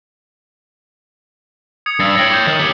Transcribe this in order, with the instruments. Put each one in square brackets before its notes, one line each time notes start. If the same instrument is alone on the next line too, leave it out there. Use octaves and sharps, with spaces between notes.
[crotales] D#6 G#6 C#7
[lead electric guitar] G2 [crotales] E6 A6 C7
[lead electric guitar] C#5 G5 [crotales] E6 A#6 F#7
[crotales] D6 G6
[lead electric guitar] D#3
G4 C#5